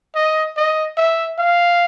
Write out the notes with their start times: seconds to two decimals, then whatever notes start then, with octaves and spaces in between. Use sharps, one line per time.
0.15 D#5
0.57 D#5
0.97 E5
1.39 F5